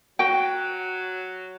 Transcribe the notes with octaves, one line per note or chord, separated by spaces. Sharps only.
F#3 F#4 G5